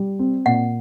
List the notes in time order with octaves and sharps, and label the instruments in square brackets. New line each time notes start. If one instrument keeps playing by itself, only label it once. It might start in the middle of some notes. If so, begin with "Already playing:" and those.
Already playing: [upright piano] G3
C4
[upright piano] A#2 [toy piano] F#5